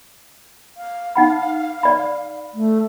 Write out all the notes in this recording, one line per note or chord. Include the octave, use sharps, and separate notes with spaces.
F5
D#4 F#5 B5
D5 B5
A3